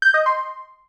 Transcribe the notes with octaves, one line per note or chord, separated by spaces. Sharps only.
G6
D#5
C6